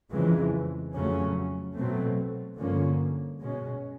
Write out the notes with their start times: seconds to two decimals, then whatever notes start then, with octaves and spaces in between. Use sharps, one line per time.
0.11 F2 C#3 E3 G#3
0.93 F2 C#3 F#3 A3 C#4
1.75 B2 F#3 A3 C4
2.57 G2 D3 F3 A#3 C#4
3.39 B2 G#3 C#4